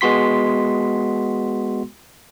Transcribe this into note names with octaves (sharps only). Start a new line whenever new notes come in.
G#3 B3 F#4 C6 B6